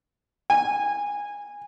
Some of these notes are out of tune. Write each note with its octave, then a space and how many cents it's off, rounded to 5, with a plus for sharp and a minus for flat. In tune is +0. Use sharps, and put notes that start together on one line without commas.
G#5 -20